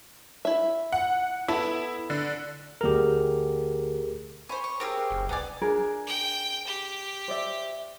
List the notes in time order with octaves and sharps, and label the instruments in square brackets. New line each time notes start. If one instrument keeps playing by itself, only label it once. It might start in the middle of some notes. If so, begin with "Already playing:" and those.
[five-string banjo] E4 E5
[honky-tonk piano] F#5
[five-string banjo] B3 A4 [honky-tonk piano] E4
[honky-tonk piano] D3
[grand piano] D2 F7 [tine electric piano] G4 G#4 A#4
[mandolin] C5 G#5 [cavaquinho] C#5 B5
[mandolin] C#6
[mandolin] C4 G4 G#4 [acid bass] A#4
[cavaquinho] F5
[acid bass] F#1
[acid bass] C2 [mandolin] B3 D5 [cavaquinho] D#4 G#5
[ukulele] D4 G#4 A#4
[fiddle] G5
G4
[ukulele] C5 D5 E5